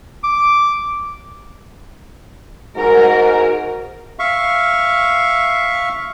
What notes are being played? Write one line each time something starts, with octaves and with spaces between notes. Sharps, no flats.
D6
G#2 F#4 A#4
E5 F5 C#6